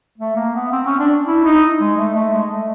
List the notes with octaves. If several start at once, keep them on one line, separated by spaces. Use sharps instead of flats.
A3
A#3
B3
C4
C#4
D4
E4
D#4
G#3
A3
A3
G#3
A3